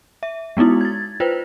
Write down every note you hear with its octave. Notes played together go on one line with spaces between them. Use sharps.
E5
G#3 B3 D#4 E4 F#4
G#6 A6
F4 B4 C5 G5